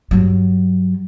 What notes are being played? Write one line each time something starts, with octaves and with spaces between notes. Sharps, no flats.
G2 F#3